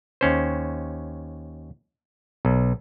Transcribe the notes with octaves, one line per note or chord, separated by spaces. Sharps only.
D#2 C#4 C5
B1